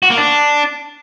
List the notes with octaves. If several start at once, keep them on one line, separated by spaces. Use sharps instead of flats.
F#4
A#3
D4